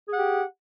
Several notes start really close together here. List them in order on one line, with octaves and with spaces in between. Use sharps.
G#4 F#5 G4